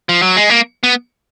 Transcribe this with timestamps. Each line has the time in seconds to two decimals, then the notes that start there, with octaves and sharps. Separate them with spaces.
0.09 F3
0.22 F#3
0.36 G#3
0.50 A#3
0.83 B3